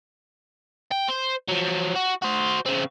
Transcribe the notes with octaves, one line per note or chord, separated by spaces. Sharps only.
G5
C5
F3 F#3
F#4
F#4 C5
C#3 C4